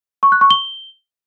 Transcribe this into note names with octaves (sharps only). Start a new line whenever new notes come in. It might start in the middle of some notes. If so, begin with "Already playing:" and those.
C#6
F#6
C#6
G7